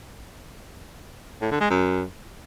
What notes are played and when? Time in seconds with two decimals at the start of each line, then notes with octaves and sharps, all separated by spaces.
1.42 A2
1.51 D3
1.61 G#3
1.70 F#2